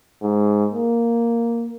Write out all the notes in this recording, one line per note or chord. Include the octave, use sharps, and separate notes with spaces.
G#2
A#3